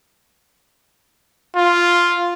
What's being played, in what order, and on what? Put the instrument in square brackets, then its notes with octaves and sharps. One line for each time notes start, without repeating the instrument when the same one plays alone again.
[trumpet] F4